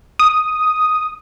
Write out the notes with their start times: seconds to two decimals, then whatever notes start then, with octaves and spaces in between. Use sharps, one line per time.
0.19 D#6